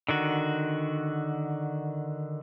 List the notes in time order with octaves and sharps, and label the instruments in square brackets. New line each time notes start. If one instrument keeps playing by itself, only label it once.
[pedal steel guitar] D3 D#3 F#4